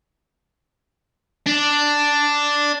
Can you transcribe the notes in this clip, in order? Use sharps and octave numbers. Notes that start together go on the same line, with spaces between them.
D4